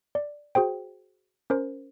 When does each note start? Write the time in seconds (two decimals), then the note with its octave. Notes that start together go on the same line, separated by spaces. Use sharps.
0.15 D5
0.55 F#4 G#4 C5 G5
1.50 C#4 A#4 C5